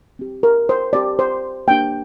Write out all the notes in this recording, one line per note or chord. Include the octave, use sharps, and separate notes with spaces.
C4 G4
A#4
C5
C4 G4 D5
C5
A#3 D4 G4 G5